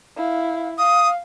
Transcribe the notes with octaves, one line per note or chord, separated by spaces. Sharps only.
E4 F5
F5 D#6